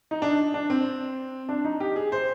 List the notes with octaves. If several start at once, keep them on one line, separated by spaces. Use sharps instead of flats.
D#4
D4
D4
C4
D4
D#4
G4
G#4
C5